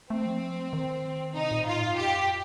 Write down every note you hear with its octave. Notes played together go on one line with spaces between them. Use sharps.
A3 C4
F3
D#3
C3 D#4
A#2
A2 F4
G2
F2 G4